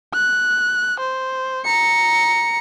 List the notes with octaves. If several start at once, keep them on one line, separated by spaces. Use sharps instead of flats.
F#6
C5
A#5 C#7